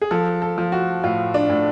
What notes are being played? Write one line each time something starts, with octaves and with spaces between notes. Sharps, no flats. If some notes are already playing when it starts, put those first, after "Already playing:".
G#4
F3 A4
A4
F3
F#4
A2 F4
D4
A2